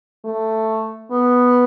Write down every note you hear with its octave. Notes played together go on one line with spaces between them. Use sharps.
A3
B3